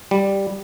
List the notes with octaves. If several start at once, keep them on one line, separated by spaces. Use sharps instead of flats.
G3